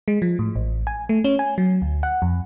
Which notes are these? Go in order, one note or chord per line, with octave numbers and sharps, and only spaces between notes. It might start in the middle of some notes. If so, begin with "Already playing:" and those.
G#3
F3
A2
A1
G#5
A3
C#4
G#5
F#3
D2
F#5
F2